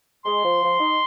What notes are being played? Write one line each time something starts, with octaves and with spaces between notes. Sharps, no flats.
G#3 C6
F3
F3
D#4